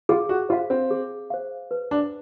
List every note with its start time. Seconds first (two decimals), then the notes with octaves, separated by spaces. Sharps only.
0.09 F4 G#4
0.29 F#4
0.49 F4 C5
0.53 F5
0.70 C4
0.91 G#4
1.30 C5 F5
1.71 B4
1.91 D4